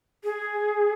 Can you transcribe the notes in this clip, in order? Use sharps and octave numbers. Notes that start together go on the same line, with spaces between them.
G#4